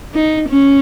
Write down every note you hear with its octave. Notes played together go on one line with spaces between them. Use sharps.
D#4
C#4